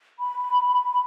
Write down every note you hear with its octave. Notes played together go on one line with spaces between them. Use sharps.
B5